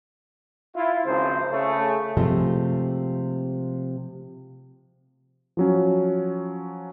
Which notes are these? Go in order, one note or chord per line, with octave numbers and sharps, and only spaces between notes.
E4 F4
G#1 C#2 C#3 F3 C4 C5
C#3 A3
C3 F3 G#3 A3
F3 F#3 C#4